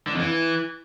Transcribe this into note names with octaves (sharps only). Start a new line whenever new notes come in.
D3
F2
E3